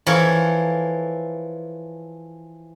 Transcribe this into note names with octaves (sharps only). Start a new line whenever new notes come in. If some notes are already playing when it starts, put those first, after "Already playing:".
E3 F3 E4 A4 A#4 C#5